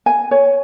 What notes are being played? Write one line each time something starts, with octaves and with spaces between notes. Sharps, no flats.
G#5
C#5